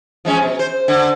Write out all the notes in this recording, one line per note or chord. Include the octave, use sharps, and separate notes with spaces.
F3 G#3 C#4
B2
C5
D3